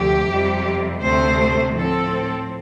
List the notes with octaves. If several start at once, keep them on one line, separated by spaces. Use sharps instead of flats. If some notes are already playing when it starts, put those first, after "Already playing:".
Already playing: D2 C3 F3 G4
F2 C3 G3
D2 C3 A3 C4 C5
A2 F3 C4 A4